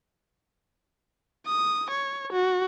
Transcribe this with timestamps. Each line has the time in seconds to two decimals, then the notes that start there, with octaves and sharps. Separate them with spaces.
1.47 D#6
1.91 C#5
2.33 F#4